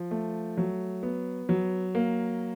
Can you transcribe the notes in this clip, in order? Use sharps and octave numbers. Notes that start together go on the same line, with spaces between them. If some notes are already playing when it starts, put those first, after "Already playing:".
Already playing: F3
A3
F#3
B3
F#3
A#3